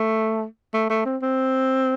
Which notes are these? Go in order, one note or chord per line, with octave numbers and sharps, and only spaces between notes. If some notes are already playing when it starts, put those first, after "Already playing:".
Already playing: A3
A3
A3
C4
C4